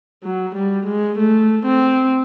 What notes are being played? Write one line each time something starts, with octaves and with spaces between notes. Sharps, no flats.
F#3
G3
G#3
A3
C4